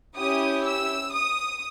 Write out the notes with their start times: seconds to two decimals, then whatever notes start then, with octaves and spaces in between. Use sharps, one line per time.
0.16 C#4 E4 G4 D#6
0.65 E6
1.13 D#6